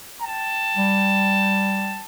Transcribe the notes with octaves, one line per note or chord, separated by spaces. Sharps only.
G5 A5
G3